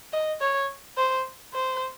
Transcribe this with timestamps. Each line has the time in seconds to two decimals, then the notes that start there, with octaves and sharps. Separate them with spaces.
0.13 D#5
0.41 C#5
0.97 C5
1.54 C5